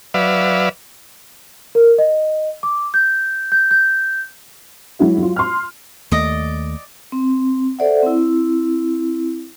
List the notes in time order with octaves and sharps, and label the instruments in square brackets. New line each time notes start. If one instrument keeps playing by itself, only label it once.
[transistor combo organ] F#3 B4 D5 E5 F5
[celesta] A#4
D#5
D6
G6
G6
G6
[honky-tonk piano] F#3 G#3 E4 F#4
F#3 F4
C6 F6
[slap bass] D#2 A3 [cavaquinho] D5 D#5
[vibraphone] C4
A4 C5 D5 E5 F#5
C4 E4